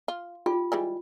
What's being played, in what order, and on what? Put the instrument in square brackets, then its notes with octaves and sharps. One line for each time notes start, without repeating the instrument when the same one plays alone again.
[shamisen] F4
[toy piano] F4 [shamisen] G4
[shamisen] E3 G3 G#3